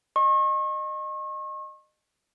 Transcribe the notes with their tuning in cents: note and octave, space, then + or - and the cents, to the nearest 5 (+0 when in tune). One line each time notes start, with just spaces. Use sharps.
D#5 -25 C#6 -40